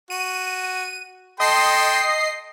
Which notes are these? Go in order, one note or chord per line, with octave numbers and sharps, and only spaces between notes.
F#4 D#7
A4 D#5 G5 C6 C7